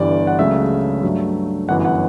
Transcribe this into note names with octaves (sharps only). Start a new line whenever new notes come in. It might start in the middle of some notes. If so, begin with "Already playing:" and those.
Already playing: G1 G2 E3 G3 D5
F#5
C#2 C#3 F#3 A3 E5
G2 F#3 A3
G1 F#2 E3 F#5
F#5